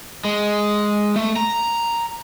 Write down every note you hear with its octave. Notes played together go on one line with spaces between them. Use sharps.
G#3
A3
A#5